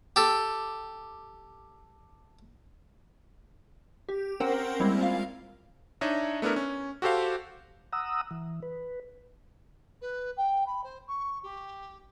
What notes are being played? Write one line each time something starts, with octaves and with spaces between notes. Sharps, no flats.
G4 A4
G4
C4 C#4 A#4 C5 F#5 G5
G3 G#3 A#3 C4 E4
F4 F5
D4 D#4 C#5 D#5 E5 A#5
A3 B3 D4 E4 A#4
C#4
F#4 G4 A4 C5 F5
F#5 A#5 D#6 E6
E3
B4
B4
G5
B5
C5
C#6
G4